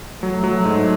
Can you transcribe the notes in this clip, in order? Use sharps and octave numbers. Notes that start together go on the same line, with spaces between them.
F#3 A3
F#3
G#2